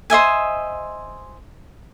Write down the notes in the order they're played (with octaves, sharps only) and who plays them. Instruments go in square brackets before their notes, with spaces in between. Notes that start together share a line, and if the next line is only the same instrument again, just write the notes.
[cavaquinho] C5 D#5 E5 G#5